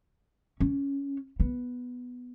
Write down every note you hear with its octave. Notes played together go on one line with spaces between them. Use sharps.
C#4
B3